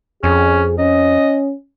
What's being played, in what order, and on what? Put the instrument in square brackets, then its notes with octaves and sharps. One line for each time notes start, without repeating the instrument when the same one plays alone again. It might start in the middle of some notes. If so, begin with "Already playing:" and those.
[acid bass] F2 [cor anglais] C#4 [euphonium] G#4
[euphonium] C#4 [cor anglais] D#5